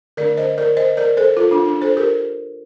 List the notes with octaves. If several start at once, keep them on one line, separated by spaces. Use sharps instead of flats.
D3 A3 D4 A#4 D5
C5 D#5
A#4 D5
C5 D#5
A#4 D5
A4 C5
F4 A4
D4 F4
D4
A4 C5
G4 A#4